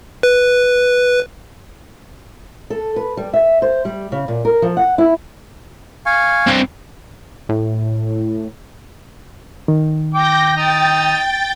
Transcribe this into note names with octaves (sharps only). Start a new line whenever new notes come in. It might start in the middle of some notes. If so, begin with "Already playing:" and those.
B4
A4
B4
G3
E5
C5
G3
C#3
A#2
A#4
F3
F#5
E4
F5 G#5 C#6
G2 C4
A2
D#3
G5 D6 G6 A#6
D#4 G5 A6